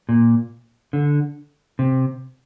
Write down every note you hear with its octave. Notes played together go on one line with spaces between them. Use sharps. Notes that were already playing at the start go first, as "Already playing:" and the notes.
A#2
D3
C3